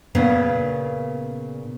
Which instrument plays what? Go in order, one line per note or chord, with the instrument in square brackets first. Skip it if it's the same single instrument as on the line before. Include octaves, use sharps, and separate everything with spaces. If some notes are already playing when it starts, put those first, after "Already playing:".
[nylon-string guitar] A#2 C#3 B3 C#4